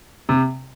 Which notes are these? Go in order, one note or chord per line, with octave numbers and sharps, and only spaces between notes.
C3